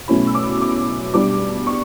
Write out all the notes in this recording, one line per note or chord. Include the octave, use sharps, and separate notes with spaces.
B2 F#3 A3 C#4 E4 B5
E6
D6
D6
B2 G3 D4 D6
C#6